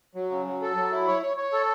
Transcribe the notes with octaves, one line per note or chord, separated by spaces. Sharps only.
F#3
C#3
F#3
A4
F#3
E4
C#5
C#5
C#5
A4